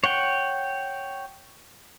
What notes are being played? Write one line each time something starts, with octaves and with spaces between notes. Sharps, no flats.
C#5 F#5 G5